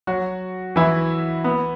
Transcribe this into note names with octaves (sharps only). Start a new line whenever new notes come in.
F#3 F#4
E3 E4
B3